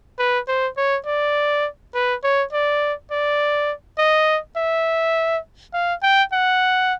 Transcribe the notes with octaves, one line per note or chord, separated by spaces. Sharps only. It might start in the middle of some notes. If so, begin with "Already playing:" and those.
B4
C5
C#5
D5
B4
C#5
D5
D5
D#5
E5
F5
G5
F#5